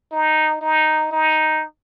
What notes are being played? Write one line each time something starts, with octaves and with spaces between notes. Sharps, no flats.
D#4
D#4
D#4